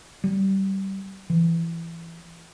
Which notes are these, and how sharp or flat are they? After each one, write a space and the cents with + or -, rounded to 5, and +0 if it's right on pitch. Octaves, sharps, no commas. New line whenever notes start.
G3 -20
E3 +20